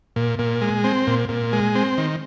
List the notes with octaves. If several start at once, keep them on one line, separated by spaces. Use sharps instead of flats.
A#2
A#2
G#3
C4
A#2
A#2
G#3
C4
D#3